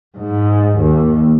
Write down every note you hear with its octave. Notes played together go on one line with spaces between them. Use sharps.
G#2
D#2